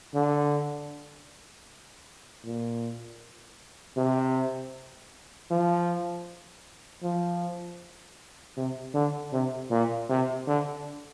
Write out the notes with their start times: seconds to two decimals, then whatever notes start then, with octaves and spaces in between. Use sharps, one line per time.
0.14 D3
2.44 A#2
3.97 C3
5.50 F3
7.02 F3
8.56 C3
8.94 D3
9.33 C3
9.70 A#2
10.09 C3
10.47 D3